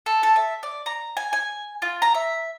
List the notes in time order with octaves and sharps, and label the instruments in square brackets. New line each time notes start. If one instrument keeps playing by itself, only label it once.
[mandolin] A4
A4
E5
D5
A#5
G#5
G#5
F4
A#5
E5